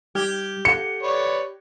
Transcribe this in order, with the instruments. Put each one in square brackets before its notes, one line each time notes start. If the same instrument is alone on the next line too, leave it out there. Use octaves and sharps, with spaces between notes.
[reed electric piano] G3 F6 G#6 [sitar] G4
[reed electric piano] A4 F#5 [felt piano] C#7
[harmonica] B4 C#5 D5